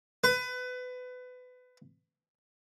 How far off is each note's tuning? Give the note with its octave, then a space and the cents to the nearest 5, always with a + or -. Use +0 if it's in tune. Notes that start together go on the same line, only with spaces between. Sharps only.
B4 +25